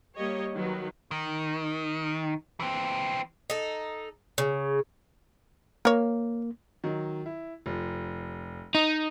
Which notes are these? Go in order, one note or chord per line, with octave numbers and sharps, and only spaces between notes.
G3 A#3 G4 C#5 D#5
D#3 F#3 B4
D#3
E3 C4
D#4 A4
C#3
A#3 A#4 C#5
D#3 F#3
E4
F1 F3
D#4